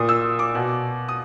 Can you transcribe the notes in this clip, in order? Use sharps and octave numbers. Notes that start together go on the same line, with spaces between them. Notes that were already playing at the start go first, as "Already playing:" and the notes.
Already playing: A#2 D#6
E6
D6
B2
D#6